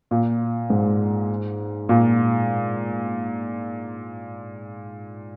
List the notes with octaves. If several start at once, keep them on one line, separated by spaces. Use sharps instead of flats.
A#2
G#2
A#2